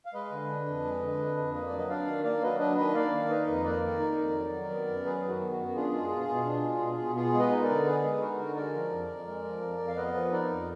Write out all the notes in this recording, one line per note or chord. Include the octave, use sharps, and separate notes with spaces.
F5
G#3 B4 D#5
D3
D4
F2
G#3
D3
D4
F2
A#3 B4 D#5
D5
F#3
D#5
D4 D5 F5
D#3
A#3 D5 F5
F#3 B4 D#5
D4 B4 D#5
D#3 B4 D#5
A#3 D5 F5
D#3
D#4 B4 D#5
F2
A#3 A#4 D5
D#3
D#4
F2
F#3
D#3
B3
F#2
F#3 G#4 B4
D#3
F#4
B3
F#4
F#2
D4 F4 G#4
G#3
B2
B2
D4
G#3
B2
B2
B3 F4 G#4
G#3
B4 D#5
D#4
A#4 D5
D3
B3 G#4 B4
G#3
D#4 F#4 A#4
D3
G#3 A#4 D5
F3
F2
F2
G#3
F3
F2
F2
F5
B3 B4 D#5
F3
D#4 A#4 D5
F2